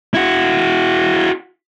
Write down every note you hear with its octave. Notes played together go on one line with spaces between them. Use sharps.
E4 F#4